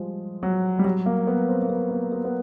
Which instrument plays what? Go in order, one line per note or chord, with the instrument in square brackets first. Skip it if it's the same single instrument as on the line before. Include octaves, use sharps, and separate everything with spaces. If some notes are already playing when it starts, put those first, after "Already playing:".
Already playing: [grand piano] F3 G3 G#3
F#3
G3
F#3
A#3
B3
C4
A#3
B3
A#3
B3
B3